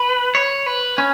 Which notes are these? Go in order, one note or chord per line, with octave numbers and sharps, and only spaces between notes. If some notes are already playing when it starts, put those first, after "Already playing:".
Already playing: B4
C#5
B4
C#4